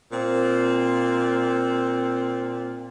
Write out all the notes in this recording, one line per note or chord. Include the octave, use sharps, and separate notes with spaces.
A#2 C4